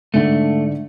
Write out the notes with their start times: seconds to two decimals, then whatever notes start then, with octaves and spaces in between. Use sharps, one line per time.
0.14 G#2 D3 A3 D4